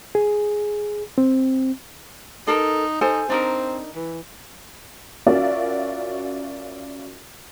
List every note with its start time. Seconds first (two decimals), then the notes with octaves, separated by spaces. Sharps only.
0.15 G#4
1.18 C4
2.47 D#4 A4 A#4
3.01 D#4 A4 C5 G#5
3.30 C4 D4 D#4 A#4
3.96 E3
5.27 C#4 F4 F#4 A#4 D5 E5